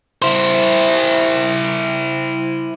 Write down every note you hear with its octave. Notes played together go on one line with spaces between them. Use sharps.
E4 C5